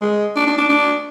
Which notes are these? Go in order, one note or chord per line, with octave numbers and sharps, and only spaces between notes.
G#3
D4
D4
D4
D4